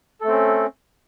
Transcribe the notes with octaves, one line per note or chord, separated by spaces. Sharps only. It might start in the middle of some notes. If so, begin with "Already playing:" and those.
A3 C4 C#4 A4